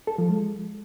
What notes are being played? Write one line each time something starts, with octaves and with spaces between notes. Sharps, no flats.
A4
F3
G#3